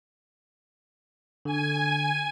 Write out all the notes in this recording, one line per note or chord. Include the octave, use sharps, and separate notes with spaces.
D3 G#5